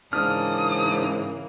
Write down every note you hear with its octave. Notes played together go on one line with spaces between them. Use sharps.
G#2 C#3 E3 A#3 D4 D#6 F6